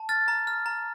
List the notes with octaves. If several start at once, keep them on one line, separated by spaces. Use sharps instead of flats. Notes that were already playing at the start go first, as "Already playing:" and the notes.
Already playing: A5
F6 A6
A#5
F6
A#5